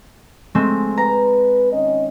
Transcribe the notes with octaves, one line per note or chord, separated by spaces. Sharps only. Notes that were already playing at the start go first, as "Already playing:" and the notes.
G#3 A3 C4
B4 A#5
D#3 C#4 D#5